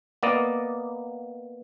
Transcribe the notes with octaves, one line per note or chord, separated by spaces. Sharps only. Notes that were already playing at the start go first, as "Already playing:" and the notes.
A#3 B3 D5 D#5